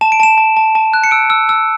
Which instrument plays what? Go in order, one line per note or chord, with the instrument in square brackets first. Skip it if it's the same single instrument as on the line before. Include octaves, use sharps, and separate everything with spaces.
[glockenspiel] A5 E7
D7
A5 E7
A5
A5
A5
F#6
C#7
E6 D7
E6
E6